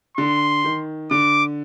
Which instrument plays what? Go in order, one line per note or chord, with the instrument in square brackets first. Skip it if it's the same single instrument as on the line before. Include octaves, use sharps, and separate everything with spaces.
[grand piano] D3 [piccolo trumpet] C6
[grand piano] D#3
[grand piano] D3 [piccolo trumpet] D6